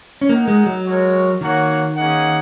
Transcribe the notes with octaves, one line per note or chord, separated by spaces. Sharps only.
C#4
A#3 D#4 A#4 F#5
G#3
F#3
G#3 F#4 A#4 C#5
D#3 A#3 F#4 C#5 F#5
A#3 C#4 G#4 D#5 F#5